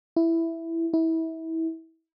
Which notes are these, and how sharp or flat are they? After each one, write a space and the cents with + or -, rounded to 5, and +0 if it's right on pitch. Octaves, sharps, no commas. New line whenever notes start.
E4 +5
E4 -25